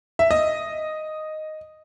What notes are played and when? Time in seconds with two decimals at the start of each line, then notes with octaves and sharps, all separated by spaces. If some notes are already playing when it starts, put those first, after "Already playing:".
0.19 E5
0.31 D#5